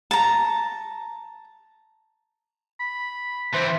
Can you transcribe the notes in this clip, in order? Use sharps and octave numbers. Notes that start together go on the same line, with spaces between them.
A5 A#5
B5
E3 C4 C5 E5 C6